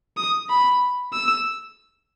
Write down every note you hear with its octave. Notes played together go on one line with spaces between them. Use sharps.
D#6
B5
E6